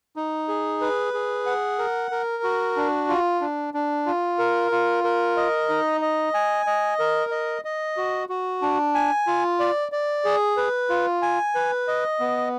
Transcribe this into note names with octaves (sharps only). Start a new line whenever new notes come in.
D#4
G#4
B4
G#4
F#5
A#4
A#4
F#4
D4
F4
D4
D4
F4
A#4
F4
A#4
D#5
D#4
D#5
G#5
D#5
A#4
D#5
D#5
F#4
F#4
D4
G#5
F4
D5
D5
G#4
B4
F4
G#5
B4
D#5
B3